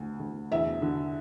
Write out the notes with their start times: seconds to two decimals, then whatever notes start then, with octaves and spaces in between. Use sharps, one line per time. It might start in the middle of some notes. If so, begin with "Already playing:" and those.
Already playing: D2
0.20 D2
0.52 E2 E5
0.82 D3